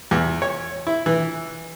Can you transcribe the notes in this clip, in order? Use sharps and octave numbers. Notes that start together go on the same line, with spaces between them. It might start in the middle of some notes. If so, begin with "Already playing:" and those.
E2
C#5
E4
E3